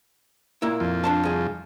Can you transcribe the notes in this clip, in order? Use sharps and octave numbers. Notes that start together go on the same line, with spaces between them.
A#2 A#3 E4
F2
D4 C5 A5
C2 G#4